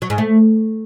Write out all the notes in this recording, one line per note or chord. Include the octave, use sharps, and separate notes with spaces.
F#3
G#2
A3